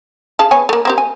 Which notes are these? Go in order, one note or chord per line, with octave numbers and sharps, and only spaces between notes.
G#4 F5 A5
B3 C#5 G#5
A3 A#3
A#3 C4 G4
G#5